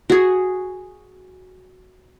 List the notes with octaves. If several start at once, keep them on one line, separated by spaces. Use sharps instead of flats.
F#4 G#4